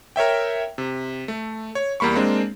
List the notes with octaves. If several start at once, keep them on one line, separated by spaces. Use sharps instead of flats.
A#4 C#5 E5 G5
C3
A3
C#5
E2 G3 A#3 B5 C#6
G#3 A#3 C4 D4